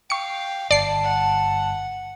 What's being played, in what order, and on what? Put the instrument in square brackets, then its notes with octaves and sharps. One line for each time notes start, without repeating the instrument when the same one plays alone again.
[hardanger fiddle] F5 [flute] G5 [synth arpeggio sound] C#6 C#7
[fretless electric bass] G1 [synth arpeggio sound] D5 C7 [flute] A5
[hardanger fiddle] F#5